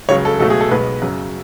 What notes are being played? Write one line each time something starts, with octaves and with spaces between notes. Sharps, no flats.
C#2 C#3 F#3 C#5
A4
C#2 B2 F#3 A3 A4
G#4
A4
B1 B2 G#3 B3 B4
F#2 C#3 F#3